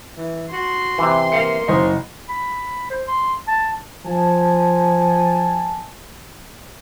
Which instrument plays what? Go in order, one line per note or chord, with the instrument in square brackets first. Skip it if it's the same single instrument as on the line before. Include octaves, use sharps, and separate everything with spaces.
[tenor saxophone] E3
[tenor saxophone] F#4 [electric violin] C6
[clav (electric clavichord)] C3 E3
[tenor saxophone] A#3 [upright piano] C7 C#7
[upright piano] F#1 C5 D#5 [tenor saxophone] C#4
[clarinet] B5
C5
C6
A5
[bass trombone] F3 [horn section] G#5 A5